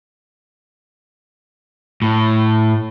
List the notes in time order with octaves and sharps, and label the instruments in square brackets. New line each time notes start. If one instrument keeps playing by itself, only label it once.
[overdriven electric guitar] A2